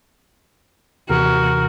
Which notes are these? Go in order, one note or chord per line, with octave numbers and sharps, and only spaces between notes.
D#2 C3 E3 F#4 A#4